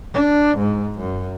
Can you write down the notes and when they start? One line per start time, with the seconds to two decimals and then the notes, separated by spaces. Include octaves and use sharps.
0.14 D4
0.58 G#2
1.00 F#2